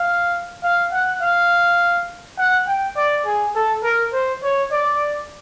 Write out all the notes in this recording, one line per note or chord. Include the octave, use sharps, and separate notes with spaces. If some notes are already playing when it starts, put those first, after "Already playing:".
Already playing: F5
F5
F#5
F5
F#5
G5
D5
G#4
A4
A#4
C5
C#5
D5